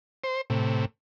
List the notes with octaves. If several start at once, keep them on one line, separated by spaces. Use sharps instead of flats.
C5
A2 C3